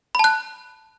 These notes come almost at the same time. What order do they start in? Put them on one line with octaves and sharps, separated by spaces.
B5 A5 F#6